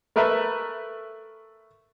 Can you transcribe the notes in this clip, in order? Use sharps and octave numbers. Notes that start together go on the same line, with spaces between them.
A3 A#4 B4 E5